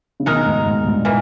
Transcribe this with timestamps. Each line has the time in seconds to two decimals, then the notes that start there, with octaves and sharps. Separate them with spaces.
0.20 C#3
0.26 B2 D#3 G#3 D#4 A#4
0.46 G#2
0.66 G#2
0.85 G2 A#2
1.05 E3 A#3